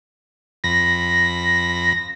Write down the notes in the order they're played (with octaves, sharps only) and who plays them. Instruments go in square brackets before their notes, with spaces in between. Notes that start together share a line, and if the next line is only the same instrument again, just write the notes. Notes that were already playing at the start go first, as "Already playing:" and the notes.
[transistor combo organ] F2 B5 [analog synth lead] A#6